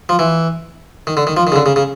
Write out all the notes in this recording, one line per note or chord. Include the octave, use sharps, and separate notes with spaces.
F3
E3
D#3
D3
D#3
F3
D#3
C#3
D3
C#3
C#3